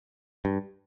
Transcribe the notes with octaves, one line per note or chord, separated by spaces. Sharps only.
G2